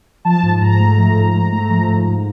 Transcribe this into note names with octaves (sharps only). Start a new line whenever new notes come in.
F3 A5
G#2
G#2 A#5
A3
F3
G#2
G#2
A3
F3
G#2
G#2